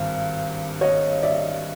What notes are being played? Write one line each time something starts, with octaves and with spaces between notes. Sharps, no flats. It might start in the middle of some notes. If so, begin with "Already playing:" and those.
Already playing: G#1 G2
C#5 D#5
D5 E5